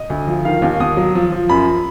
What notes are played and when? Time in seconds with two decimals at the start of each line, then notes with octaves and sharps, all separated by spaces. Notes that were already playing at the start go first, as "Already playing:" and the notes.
Already playing: D#5
0.10 D2
0.27 F3
0.45 D#3 F5
0.62 D#2
0.80 D#2 D#6
0.97 F#3
1.15 F3
1.32 F3
1.49 F#2 B5